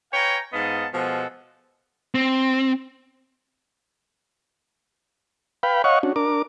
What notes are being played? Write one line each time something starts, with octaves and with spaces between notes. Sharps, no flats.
B4 C#5 F5 G5 G#5 A#5
G#2 B3 D#5 F5 F#5 A5
B2 F3 G#3 A4 D#5 F#5
C4
B4 F5 G5 B5
C#5 D#5 F5 F#5 C#6
C#4 D4 F#4
D4 A#4 D6